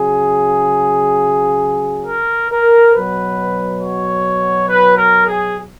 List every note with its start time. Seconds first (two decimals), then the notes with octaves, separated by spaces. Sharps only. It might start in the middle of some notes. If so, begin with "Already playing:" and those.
Already playing: C#3 F#3 G#4
2.07 A#4
2.51 A#4
2.94 B2 F#3 B4
3.81 C#5
4.68 B4
4.97 A#4
5.26 G#4